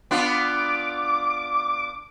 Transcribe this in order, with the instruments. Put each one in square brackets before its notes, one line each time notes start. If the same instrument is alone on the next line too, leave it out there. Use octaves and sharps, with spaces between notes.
[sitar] B3 D4 F4 [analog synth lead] D6